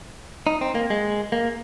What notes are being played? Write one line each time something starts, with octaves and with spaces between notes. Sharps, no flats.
D#4
C4
A#3
G#3
A#3